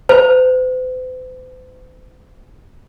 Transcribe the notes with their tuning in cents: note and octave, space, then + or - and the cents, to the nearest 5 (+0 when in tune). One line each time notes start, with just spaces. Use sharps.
C5 -45